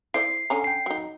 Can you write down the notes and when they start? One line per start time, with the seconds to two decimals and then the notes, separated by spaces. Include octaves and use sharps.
0.14 E4 C5 D5 C7
0.50 D3 C#4 A#5
0.64 G5 C7
0.86 F#3 D#4